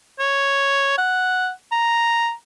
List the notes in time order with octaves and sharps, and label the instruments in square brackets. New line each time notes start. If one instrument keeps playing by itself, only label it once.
[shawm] C#5
F#5
A#5